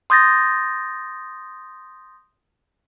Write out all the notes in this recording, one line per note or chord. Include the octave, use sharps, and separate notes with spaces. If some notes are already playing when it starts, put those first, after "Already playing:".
C6 D#6 G6 A6 A#6